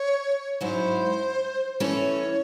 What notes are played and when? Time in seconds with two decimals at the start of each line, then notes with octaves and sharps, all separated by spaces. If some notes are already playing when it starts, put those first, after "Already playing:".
Already playing: C#5
0.61 G#2 F#3 C#4 E4 C5
1.80 E3 A3 C#4 C#5